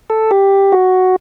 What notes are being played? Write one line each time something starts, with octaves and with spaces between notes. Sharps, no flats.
A4
G4
F#4